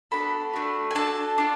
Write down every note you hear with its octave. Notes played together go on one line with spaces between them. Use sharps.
B3 D4 F#4 A4 B5
A3 D4 F#4
G#5
D4 F#4 A4 A5
D4 F4